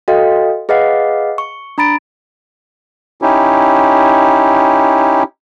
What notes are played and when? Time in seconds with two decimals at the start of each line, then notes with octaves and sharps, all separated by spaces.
0.08 F#4 A4 D#5 F5 G5
0.69 G#4 B4 D#5 F5 F#5
1.38 C#6
1.78 D4 A#5 B5 A6 D7
3.22 C#4 D#4 E4 G4